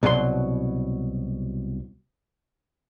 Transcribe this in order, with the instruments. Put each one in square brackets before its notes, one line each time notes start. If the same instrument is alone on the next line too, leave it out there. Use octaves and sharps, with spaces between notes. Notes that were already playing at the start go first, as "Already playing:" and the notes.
[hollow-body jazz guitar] C2 B2 F#3 G#4 C6